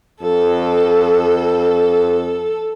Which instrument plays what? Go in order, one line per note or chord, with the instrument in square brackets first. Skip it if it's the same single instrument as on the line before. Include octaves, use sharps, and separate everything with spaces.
[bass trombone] F2 [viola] A4